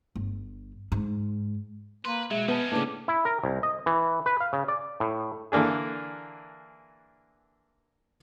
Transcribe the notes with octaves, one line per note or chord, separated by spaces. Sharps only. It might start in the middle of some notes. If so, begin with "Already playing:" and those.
G1
G#2
A#3 B4 C6
B2 F#3 G#3 E5
B3 C#4 D#4 B4 A5
A2 C#3 A#3 D4 B4 D6
E4
A#4
C2
D#5
E3
B4
F5
C#3
D5
A2
D3 E3 A#3 D4 G#4